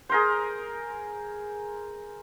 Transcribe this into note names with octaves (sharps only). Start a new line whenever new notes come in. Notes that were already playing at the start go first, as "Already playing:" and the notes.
G#4 A#4 C5